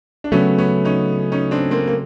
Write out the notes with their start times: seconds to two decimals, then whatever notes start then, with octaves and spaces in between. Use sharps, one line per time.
0.24 D4
0.32 C#3 F#3 A3 B3 C#4
0.58 B3 C#4
0.85 C#4 D#4
1.32 C#4 D#4
1.51 C4 D4
1.71 A#3 C4
1.87 A#3